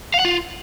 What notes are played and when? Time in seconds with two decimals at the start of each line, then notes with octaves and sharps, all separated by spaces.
0.14 F5
0.19 F#5
0.25 F4